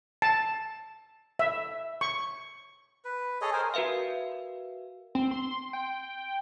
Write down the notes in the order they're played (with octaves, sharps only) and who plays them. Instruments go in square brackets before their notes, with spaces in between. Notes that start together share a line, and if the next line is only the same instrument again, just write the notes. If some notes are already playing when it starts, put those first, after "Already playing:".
[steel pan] A5
E5
C#6
[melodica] B4
G#4 A4 C#5 D#5
A#4 C5 G5 G#5
[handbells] F#4 A#4 B4 E5 F5
[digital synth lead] C4
C6
G5